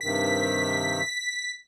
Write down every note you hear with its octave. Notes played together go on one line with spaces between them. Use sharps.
G2 C3 D#3 B6